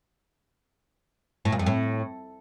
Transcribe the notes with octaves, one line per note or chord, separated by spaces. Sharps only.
A2
A#2
F2
A2